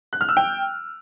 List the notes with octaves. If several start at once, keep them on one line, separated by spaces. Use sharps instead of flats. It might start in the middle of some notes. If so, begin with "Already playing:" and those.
F#6
F6
E6
G5